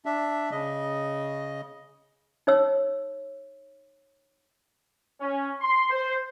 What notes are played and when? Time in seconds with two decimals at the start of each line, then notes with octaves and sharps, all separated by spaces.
0.05 D4 E5
0.52 C#3 D#5
2.47 D#4 C#5 E6
5.20 C#4
5.60 C6
5.90 C5